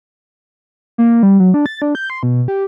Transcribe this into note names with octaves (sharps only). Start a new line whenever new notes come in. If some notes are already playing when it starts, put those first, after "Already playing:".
A#3
G3
F#3
D4
A6
D4
G6
C6
B2
G4